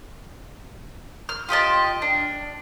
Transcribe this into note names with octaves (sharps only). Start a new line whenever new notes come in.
F6
F4 G4 D#5 A5
D4